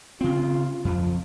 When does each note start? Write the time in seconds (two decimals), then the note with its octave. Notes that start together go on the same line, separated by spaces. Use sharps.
0.21 C#3 C4 F4
0.85 F2 F3